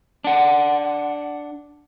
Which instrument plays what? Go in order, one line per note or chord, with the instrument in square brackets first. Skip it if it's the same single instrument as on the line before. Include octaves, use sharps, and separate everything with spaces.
[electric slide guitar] D4 F#5